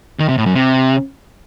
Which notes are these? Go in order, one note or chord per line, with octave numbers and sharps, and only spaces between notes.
D#3
C3
A2
F#2
C3